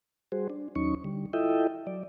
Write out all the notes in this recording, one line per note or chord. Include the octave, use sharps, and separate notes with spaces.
G3 F#4 G#4 C5
D4
D#2 F#3 C#4 D#4 C#6
D3 G3
E4 F4 A4 D#5 E5 G5
F#3 D5